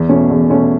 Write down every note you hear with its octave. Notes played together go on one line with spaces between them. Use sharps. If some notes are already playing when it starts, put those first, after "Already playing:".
Already playing: E2
B2 A3 C#4
E2
B2 A3 C#4